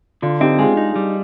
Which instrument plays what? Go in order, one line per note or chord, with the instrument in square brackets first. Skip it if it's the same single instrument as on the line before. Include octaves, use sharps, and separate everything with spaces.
[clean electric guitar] D3 [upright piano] D4 F4
[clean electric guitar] C4 [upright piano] D#4 G4
[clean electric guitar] G#3 [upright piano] F4 G#4
[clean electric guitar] D#4
G3